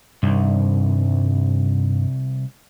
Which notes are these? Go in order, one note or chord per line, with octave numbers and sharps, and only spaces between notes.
C2 G2 D#3